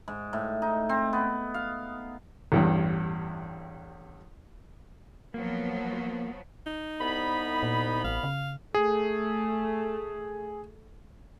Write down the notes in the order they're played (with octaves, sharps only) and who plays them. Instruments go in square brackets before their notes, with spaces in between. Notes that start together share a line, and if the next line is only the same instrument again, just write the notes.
[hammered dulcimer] G#2
A2
D#4
C4
B3
F5
[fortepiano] A1 E2 G2
[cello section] F3 F#3 B3 [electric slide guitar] A#3
[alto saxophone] D#4
[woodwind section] C2 B3 B5
[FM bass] A#2
[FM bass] A1 [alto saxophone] F5
[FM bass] C#3
[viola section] A3 [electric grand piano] G#4